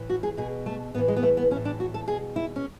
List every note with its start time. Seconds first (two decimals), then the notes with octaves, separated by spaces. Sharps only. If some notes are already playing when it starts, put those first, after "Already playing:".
Already playing: A2 E3
0.10 F#4
0.23 G#4
0.37 B2 G#4
0.66 A3
0.94 A2 B3
0.98 E3
1.08 G#3
1.16 B3
1.23 A3
1.37 B3
1.50 E3 C#4
1.56 A2
1.65 D4
1.80 F#4
1.94 A4
2.08 B2 G#4
2.36 E4
2.56 C#4